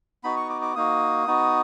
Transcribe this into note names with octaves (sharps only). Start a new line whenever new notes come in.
B3 D#4 F#4 B5
C#6
D6
D6
A#3 D#4 F#4 D#6
B3 D#4 F#4